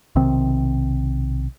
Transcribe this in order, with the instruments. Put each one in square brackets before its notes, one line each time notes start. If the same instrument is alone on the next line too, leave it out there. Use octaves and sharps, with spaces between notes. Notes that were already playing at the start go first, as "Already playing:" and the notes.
[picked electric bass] B1 C3 D#3 C4